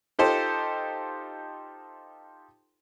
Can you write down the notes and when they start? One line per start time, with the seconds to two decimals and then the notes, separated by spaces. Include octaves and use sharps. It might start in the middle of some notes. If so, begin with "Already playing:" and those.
0.19 D#4 F4 G4 A4 C5